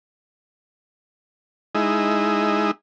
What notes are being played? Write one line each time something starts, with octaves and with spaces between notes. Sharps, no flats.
G#3 D#4 E4